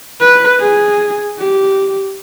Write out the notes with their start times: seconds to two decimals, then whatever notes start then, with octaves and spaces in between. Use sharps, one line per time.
0.20 B4
0.60 G#4
1.39 G4